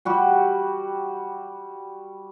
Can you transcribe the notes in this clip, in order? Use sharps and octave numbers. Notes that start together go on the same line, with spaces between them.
G3 F#4 G4